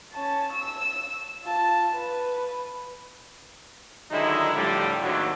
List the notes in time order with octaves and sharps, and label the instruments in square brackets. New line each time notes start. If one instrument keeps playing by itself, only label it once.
[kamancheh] C#4 A5
E6
F4 A5
B4
[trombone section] D3 D#3 F#3 G#3 D#4 E4
A2 D3 F3 G3
G#1 D#2 A2 D3 F#3